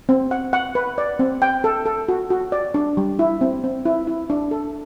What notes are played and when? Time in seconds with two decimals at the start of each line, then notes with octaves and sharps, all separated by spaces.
0.09 C4
0.31 F#5
0.53 F#5
0.75 B4
0.98 D5
1.19 C4
1.42 G5
1.64 A4
1.85 A4
2.08 F#4
2.30 F#4
2.52 D5
2.74 D4
2.97 G3
3.19 E4
3.41 C4
3.64 C4
3.85 E4
4.07 E4
4.30 D4
4.51 A4